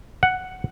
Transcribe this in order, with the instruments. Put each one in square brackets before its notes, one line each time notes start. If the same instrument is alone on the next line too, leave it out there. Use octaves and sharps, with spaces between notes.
[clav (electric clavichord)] F#5